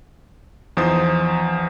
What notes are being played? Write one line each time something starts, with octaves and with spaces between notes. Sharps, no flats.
E2 F3 D#4 C5 D#6 A6